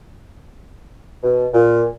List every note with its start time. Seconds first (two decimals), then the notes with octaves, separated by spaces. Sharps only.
1.23 B2
1.53 A#2